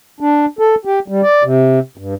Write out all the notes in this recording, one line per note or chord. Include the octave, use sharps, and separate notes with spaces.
D4
A4
G4
G3
D5
C3
G2